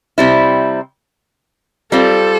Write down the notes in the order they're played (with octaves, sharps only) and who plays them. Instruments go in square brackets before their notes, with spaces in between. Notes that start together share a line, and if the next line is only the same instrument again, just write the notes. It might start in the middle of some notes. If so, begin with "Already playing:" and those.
[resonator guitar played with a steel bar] C3 G3 C4 E4
[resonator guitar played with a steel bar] G3 C4 F4 [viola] A4